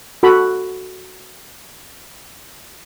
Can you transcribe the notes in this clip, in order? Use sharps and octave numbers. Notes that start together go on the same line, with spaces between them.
F#4 A4 B5